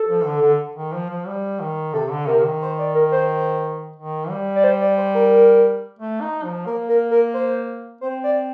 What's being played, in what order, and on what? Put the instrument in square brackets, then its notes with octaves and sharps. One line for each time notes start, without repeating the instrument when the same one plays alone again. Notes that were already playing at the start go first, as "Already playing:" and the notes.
Already playing: [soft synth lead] A4
[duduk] F3
D3
D3
D#3
F3
F3
G3
D#3
[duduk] C3 [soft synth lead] A4
[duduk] D3
[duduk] C3 [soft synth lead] A#4
[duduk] D#3
[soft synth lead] C5
D5
A#4
C5
[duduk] D#3
G3
[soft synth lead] D5
C5
D5
C5
A#4
[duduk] A3
D#4
F3
[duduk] A#3 [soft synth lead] A#4
[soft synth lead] A#4
A#4
C5
[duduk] C4 [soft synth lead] C5
[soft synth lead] D5